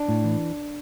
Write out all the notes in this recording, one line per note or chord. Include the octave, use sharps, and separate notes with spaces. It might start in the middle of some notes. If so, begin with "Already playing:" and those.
Already playing: D4
A2
E3